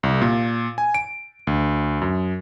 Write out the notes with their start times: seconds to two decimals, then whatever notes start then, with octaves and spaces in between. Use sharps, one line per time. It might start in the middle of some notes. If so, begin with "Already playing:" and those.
0.03 C2
0.22 A#2
0.78 G#5
0.94 D7
1.47 D2
2.02 F#2